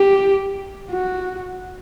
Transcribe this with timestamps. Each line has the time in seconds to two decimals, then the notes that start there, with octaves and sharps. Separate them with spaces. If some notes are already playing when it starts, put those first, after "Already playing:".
Already playing: G4
0.91 F#4